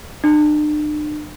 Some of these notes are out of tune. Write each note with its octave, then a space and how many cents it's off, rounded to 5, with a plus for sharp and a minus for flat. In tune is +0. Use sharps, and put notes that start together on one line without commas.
D4 +40